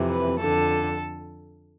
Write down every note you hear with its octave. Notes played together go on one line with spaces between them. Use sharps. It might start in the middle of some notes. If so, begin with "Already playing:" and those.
Already playing: F2 C3 E3
B4
F2 D3 A4